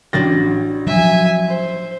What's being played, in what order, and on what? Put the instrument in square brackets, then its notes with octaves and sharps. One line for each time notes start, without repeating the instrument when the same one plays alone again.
[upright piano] A1 A6 A#6 [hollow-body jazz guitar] D4 F#4 G5
[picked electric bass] F3 F#3 [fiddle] E5 G#5
[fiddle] C5